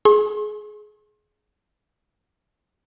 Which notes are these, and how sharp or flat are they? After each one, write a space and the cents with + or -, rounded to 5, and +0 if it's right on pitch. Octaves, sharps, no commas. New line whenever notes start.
G#4 +20 C6 +40